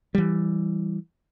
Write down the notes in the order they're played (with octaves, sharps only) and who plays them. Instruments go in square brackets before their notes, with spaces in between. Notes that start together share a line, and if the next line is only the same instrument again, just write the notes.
[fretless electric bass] E3 G3